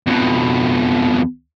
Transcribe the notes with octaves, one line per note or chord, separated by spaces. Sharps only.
F2 B2